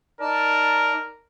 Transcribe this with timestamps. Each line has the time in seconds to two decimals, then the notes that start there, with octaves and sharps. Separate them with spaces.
0.21 D#4 A#4 D5 A5